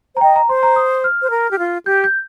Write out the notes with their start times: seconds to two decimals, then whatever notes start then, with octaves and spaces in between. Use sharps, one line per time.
0.15 C5 A#5
0.21 D#5 G5
0.36 A#5
0.49 C5 C6
0.63 A#5
0.76 D#6
1.04 F6
1.22 C5
1.30 A#4
1.51 G4
1.59 F4
1.86 G4 G6
2.04 G6